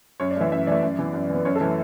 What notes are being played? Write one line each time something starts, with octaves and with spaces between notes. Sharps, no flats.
F#2 C#5
D5
E3 A3 E5
F#2 E5
E3 A3 D5
F#2
E3 B3
F#2
E3 B3
F#2 C#5
A4
E3 A3